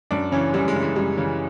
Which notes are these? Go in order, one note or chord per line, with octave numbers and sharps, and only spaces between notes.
F#2 D4
C#3 E3 C#4
G#3
F#2 G3
G#3
C#3 E3
G#3
F#2 G3
C#3 E3